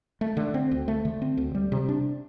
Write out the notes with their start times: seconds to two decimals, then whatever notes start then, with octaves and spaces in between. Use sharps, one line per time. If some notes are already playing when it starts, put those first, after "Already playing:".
0.21 A3
0.37 D3
0.54 C4
0.71 D2
0.88 A3
1.05 D3
1.22 C4
1.37 D2
1.55 G3
1.72 C3
1.89 D4